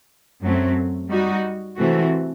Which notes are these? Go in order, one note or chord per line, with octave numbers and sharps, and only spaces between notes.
F#2 F#3 A3 C4
G3 D#4 F#4
C3 E3 A3 C4 F#4